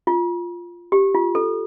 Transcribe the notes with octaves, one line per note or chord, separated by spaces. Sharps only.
F4
G4
F4
A4